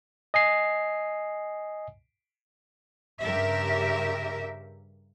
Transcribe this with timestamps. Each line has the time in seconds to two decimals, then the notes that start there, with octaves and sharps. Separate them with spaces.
0.34 D#5 G#5 C7
3.21 G2 C#3 G4 A#4 E5